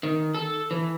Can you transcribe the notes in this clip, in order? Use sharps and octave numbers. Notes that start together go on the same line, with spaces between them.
D#3
A4
E3